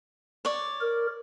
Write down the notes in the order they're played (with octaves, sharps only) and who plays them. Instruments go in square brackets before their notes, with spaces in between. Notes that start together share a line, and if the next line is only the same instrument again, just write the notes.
[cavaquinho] C#5 D5
[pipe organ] A#4